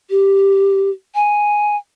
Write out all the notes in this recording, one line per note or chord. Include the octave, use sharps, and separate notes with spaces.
G4
G#5